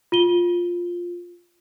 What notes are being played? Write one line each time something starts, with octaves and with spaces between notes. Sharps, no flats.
F4 D#7 G7